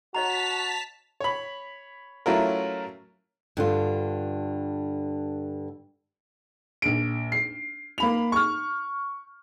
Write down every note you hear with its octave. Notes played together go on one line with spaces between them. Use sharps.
F#4 C#5 D#5 A5 A#5 B6 F7
C#5 B5
F#3 A3 C#4 E4 F4 A#4
G2 D3 F4
A#1 D7
C7
A#3 B5 F7
C#6 F6